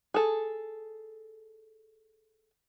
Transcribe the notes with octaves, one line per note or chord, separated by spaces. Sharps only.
G#4 A4